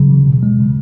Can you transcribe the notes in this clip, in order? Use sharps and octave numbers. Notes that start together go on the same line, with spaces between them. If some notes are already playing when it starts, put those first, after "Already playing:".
Already playing: C#3 F#3
E3
B2
G#3
C#3